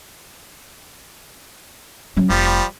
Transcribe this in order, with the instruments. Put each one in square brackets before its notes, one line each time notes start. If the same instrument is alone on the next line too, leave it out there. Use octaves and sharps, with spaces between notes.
[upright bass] F#3 C#4
[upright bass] F1 [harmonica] F3 G3